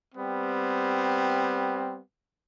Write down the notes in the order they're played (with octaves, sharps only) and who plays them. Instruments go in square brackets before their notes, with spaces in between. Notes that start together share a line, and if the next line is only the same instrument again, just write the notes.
[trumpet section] G3 B3 C4